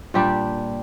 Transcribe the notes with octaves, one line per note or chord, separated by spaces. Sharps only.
A#2 G3 D4 G4